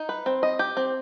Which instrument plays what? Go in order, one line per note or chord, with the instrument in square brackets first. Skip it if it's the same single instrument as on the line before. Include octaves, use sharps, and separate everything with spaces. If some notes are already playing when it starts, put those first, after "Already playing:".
Already playing: [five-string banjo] D#4
B4
C4
D#5
G4
C4